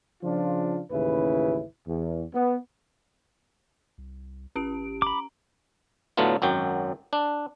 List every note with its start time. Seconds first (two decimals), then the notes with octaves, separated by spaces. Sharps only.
0.23 C#3 F3 D4 F4
0.91 A1 D#2 C#3 E4 B4
1.88 E2
2.35 B3
3.98 C2
4.56 G#1 C#4 G4 D7
5.02 A#5 B5 D6
6.17 A2 D3 F#3 A3 B3 F4
6.42 G#1 F#2 F#3 G5
7.13 D4